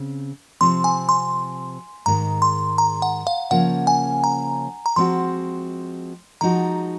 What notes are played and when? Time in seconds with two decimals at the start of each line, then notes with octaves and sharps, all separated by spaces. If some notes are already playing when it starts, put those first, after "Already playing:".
Already playing: C#3 C4
0.61 C3 F3 C4 C6
0.84 G#5
1.09 C6
2.06 G#2 D#3 G#3 A#5
2.42 C6
2.78 A#5
3.02 F#5
3.27 F5
3.51 C#3 F3 A#3 C#4 F#5
3.87 G#5
4.24 A#5
4.86 A#5
4.96 F3 G#3 C4 F#4 C6
6.41 F3 G#3 D#4 F#4 A#5